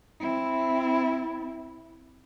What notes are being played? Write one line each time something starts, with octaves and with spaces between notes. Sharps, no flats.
C4 E4